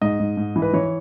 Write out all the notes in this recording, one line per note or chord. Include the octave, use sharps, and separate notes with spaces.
G#2 D#5
G#2
G#2
E3
B4
E3 C#5